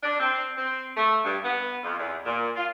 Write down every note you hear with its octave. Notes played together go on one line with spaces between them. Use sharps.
D4
C4
C4
A3
G2
B3
F2
E2
A#2
F4